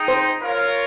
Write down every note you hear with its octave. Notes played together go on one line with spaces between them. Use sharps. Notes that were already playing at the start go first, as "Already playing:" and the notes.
Already playing: D#4 G#4 D#5 G5
C5
F4 A#4 C#5 F5